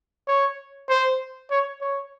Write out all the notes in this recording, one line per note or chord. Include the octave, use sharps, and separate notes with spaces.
C#5
C5
C#5
C#5